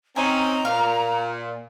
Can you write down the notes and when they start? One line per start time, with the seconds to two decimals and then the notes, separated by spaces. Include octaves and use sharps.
0.16 C4 C#4 D#4 G#5 A#5
0.65 A#2 F5